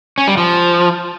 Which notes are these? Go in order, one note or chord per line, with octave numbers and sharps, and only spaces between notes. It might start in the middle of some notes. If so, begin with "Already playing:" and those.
C#4
G3
F3